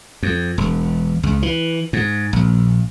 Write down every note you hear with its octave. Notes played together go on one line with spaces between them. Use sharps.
F2
E1
C#2
E3
G#2
A#1